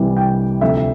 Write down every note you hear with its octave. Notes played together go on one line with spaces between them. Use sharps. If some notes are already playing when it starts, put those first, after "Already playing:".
Already playing: C2 C3 E3 G3
G5
D2 C3 F3 E5